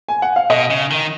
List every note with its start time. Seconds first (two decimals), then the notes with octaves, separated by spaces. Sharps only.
0.09 G#5
0.22 F#5
0.36 F5
0.50 B2 D#5
0.71 C#3
0.91 D#3